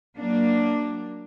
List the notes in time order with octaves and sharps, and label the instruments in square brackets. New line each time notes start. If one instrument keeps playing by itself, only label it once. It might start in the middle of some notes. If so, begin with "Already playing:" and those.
[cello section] F#3 A#3 D4